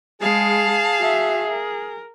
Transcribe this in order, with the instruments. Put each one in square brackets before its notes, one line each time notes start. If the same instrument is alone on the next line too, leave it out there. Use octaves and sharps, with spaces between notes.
[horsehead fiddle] G#3 [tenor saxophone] G#4 [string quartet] F5 A5
[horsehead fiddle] F#4 E5
A#4